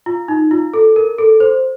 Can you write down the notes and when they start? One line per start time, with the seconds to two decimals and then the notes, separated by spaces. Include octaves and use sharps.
0.06 F4
0.28 D#4
0.51 F4
0.74 A4
0.96 A#4
1.18 A4
1.40 C5